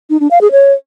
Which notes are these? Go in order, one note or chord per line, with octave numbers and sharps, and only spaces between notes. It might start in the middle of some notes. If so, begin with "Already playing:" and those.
D#4
D4
F5
G#4
C#5